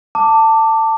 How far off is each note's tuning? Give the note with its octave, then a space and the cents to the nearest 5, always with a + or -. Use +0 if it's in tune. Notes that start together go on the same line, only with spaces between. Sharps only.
A5 +20 D6 +0